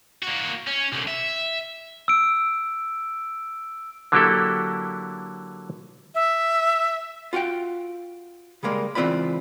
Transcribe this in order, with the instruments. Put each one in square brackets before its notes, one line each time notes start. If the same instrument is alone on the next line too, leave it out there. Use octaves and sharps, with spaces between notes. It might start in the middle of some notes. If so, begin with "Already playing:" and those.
[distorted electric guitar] A#3 F#4
C#4
C2 D3
E5
[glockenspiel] E6 D7
[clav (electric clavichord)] D3 F#3 A#3 E4 G4 A4
[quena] E5
[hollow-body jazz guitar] F4 F#4 F5 G5
C#3 G3 G#3 A#3
C#2 E3 C4 F4 D5 B5